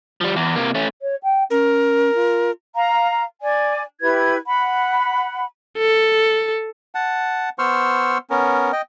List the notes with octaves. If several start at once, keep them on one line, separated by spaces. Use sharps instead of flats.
F3 G3
E2
C3 A#3
A3 C#4
C#5
G5
C#4 A#4
F4
F5 A#5
D5 G#5
E4 G4 B4 G#6
F#5 B5
A4
F#5 A5
B3 C5 C6 C#6 E6 F6
B3 C#4 A#4
D#5 G5